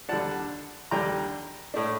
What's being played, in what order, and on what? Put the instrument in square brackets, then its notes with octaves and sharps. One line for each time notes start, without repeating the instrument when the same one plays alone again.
[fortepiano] D#2 D3 G3 D4 F#5 A5
D#2 D3 G3 D4 G5 A#5
A2 A3 D4